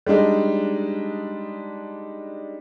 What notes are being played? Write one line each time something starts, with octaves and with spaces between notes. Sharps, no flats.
G3 G#3 D4 D#4